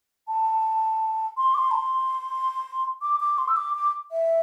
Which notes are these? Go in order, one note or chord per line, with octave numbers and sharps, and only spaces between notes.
A5
C6
D6
C6
A5
C6
D6
D6
C6
E6
D6
D6
E5